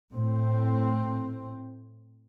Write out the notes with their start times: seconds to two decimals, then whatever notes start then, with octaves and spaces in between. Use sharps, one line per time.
0.12 A2 C4